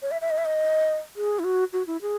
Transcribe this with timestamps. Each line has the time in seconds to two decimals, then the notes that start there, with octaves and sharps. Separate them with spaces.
0.02 C#5
0.11 E5
0.21 E5
0.31 D#5
0.38 E5
0.45 D#5
1.16 G#4
1.39 E4
1.44 F#4
1.73 F#4
1.87 E4
2.02 G#4